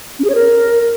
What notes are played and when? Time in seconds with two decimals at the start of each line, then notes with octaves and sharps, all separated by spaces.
0.19 C#4
0.24 G#4
0.30 C#5
0.35 A#4